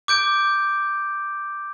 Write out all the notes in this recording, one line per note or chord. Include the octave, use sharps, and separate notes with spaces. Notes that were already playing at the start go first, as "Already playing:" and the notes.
D6 G6 D7